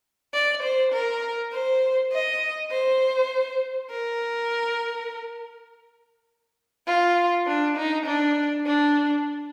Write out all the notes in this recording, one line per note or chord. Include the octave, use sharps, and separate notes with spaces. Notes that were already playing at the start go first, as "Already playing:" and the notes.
D5
C5
A#4
C5
D#5
C5
A#4
F4
D4
D#4
D4
D4